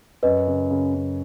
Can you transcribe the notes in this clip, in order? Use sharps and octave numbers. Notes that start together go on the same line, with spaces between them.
F#2 B4 D#5
C#3
C#3
F#2